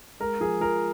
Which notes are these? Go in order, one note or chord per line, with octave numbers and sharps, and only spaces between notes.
G#3 A#4
F3 G#4
F3 A#4